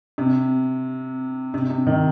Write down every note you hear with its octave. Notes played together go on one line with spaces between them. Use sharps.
C3
C3
C3
D#3